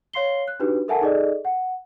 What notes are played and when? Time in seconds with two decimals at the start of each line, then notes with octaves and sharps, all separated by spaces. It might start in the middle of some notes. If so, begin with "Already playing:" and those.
0.13 C#5 F5 C6 C7 G7
0.48 F#6
0.60 D4 D#4 F#4 G4 B4
0.88 A4 A#4 E5 F#5 G#5 A5
1.01 D#4 G#4 A4 D5 D#5
1.45 F#5